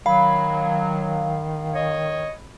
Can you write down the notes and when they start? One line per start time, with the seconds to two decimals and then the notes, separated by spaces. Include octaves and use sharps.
0.06 D#3 F#3 F5 B5
1.73 C#5 D#5